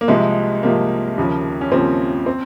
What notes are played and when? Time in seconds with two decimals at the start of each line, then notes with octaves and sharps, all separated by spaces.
0.01 A#3
0.08 C2 C3 F3 G#3
0.63 C2 C3 F3 A#3
1.18 D#2 C#3 F3
1.61 C#4
1.71 D#2 C#3 F3 C4
2.26 C4